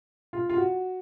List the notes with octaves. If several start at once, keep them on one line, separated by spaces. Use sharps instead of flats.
F4
F4
F#4